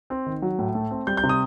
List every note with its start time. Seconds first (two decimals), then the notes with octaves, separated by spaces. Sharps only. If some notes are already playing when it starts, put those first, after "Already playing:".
0.10 C4
0.26 D#3
0.42 F#3
0.59 A2
0.75 A3
0.91 C4
1.07 G3 G6
1.17 G6
1.23 C3
1.29 D#6